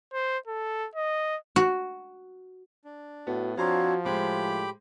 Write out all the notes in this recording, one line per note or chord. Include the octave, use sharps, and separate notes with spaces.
C5
A4
D#5
F#4
D4
A2 B3 F#4
F3 C4 D4 F#4 C#5 F5 A#5 C6
A2 G#3 G4 C5 B5 D6